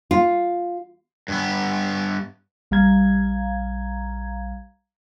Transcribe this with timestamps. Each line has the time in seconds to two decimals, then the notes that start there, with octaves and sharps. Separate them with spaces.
0.11 F4
1.28 G2 B3
2.71 A#1 G3 F5 A#5 G#6